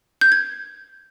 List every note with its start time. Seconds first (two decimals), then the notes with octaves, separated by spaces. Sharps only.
0.21 G6
0.32 G#6